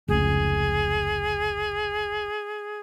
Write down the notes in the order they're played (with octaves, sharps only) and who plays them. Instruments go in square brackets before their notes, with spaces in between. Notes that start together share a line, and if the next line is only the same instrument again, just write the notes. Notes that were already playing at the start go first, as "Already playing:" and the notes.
[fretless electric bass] F1 C#2 [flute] G#4